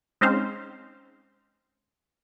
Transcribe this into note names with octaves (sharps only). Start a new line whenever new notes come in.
G#3 C4 C#4 D#4 C5 F5